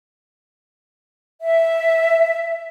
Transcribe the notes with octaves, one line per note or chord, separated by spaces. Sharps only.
E5